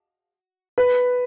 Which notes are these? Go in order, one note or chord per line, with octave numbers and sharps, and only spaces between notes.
B4